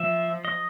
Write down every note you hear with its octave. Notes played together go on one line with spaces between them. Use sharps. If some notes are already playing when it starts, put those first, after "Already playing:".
Already playing: F3 E5
D#5